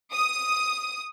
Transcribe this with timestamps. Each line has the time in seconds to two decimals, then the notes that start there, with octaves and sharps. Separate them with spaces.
0.13 D#6